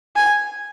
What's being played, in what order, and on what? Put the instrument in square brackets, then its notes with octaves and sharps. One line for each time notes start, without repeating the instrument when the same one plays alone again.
[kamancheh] G#5